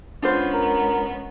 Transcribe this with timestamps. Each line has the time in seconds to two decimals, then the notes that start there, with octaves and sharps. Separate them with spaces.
0.22 G#3 B3 C#4 D4 F4 C5
0.54 A#4